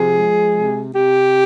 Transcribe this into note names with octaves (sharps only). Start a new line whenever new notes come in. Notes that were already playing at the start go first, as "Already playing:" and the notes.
Already playing: C3 F3 G#4
G#3
C3
C3 G4